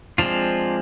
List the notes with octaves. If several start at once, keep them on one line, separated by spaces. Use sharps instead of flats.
F3 G#3 C4 D4 F4